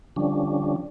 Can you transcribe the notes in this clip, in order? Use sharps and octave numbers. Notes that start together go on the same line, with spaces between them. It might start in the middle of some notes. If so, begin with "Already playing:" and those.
D3 F3 G3 C#4 D4